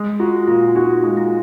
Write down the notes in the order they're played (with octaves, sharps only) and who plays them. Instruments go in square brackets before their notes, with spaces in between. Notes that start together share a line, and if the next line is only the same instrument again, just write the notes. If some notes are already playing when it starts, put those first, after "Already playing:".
Already playing: [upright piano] G#3
[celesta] F4 [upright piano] F#4
[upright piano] A#2 [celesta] F4
[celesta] D#4 [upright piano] F#4
[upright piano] G#3
[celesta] F4